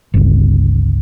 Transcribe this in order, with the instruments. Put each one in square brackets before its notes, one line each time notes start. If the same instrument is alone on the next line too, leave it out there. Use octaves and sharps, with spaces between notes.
[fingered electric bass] G1 C#2